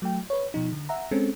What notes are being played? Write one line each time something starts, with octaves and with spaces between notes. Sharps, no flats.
F#3 A3 G5
B4 C#5
B2 F3 D#4
D3
E5 F#5 A#5
G#3 C4 C#4 A4